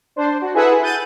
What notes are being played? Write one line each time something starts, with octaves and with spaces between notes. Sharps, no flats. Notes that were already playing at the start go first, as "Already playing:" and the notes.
D4 C5
F#4
E4 G#4 A4 B4 E5 F#5
F#6 G6 A6 D#7